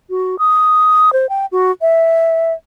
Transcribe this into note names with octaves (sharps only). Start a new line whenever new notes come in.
F#4
D#6
C5
G5
F#4
E5